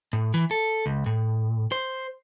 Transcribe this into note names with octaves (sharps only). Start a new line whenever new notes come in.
A2
E3
A4
C#2
A2
C5